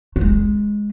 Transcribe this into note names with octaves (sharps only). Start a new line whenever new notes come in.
A3
G#3